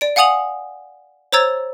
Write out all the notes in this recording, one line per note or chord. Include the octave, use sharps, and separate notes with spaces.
D5 D7
F5 F#5 G#5 D#6 F7 F#7
C5 C#5 A#5 E6 G#6 A6